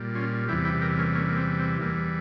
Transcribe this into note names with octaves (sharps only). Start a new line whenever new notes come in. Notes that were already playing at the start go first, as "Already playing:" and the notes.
Already playing: A#2 G3
C#4 F4
E2 C3 E3 G3 E4 G4
E4 G4
G4 A#4
A#3 C#4
A#3 C#4
A#3
C4
C4
E2 E3 G3 A#3